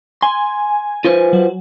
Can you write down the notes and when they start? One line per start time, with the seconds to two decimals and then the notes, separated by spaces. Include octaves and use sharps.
0.22 G#5 C6
1.05 F4 B4 C5
1.33 F#3